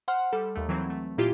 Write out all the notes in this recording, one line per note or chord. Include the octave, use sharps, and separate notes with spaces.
C5 F#5 C6 F6
G3 A4
D#2 A3
E3 F#3 C4
A3
A#2 E4 F4 G4